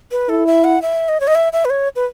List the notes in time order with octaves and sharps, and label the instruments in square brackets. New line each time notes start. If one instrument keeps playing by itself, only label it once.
[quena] B4
[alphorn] E4 [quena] A4
[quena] E5
F#5
E5
D#5
C#5
D#5
E5
E5
B4
C#5
B4